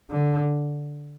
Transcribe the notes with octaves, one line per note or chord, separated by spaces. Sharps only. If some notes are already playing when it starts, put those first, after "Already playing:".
D3